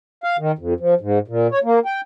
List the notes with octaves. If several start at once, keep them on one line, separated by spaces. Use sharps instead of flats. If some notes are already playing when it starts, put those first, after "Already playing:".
F5
D#3
F2
F3
G#2
A#2
C#5
A#3
G5